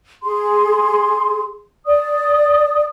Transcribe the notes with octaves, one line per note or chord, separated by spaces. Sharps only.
G#4 C6
D5 D#6